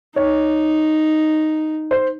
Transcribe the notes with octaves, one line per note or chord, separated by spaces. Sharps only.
D#4 C#5
C5